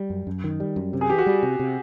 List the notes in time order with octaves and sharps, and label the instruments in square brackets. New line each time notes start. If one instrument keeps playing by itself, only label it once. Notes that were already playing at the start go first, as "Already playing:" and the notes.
Already playing: [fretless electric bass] G3
F#2
F#2
D#3
G3
F#2
C3
[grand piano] G#4
[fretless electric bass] E3 [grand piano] G4
[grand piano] F#4
[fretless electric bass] G3
C3
C3